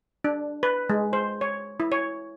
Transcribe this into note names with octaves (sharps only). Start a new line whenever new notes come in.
D4
B4
G#3
C5
C#5
E4
C#5